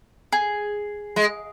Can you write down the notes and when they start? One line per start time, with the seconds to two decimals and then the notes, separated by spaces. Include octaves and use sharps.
0.32 G#4
1.16 G#3